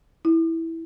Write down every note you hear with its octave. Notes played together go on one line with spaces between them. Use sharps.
E4